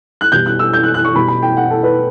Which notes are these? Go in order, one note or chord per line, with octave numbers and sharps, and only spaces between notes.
F#6
B2 G3 G6
F#6
E6
G6
F#6
F#6
C#6
B2 G3 B5
B5
G5
F#5
A4
B4